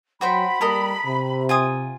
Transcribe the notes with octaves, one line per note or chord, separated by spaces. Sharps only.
F#3 F#4 C5 G5 B5
G3 A#3 A4 A#4 D#5
C3
F4 G#5 D#6